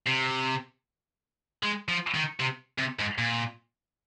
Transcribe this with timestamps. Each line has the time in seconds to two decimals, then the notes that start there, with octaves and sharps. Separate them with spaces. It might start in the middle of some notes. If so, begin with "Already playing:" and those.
0.06 C3
1.63 G#3
1.88 F3
2.14 D#3
2.40 C3
2.79 C3
2.99 G#2
3.18 A#2